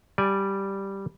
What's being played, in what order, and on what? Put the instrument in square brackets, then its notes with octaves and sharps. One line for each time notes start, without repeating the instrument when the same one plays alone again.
[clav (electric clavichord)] G3 D5 G#5